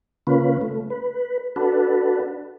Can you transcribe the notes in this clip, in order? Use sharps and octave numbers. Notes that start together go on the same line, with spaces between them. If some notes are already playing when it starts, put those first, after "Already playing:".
C#3 A#3 C#4 F4 B4
A3
B4
D4 F#4 A4 B4